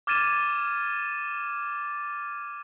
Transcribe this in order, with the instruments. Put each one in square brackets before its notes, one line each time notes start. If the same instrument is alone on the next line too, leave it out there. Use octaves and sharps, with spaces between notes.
[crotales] D6 F6 G#6 A6 D#7 E7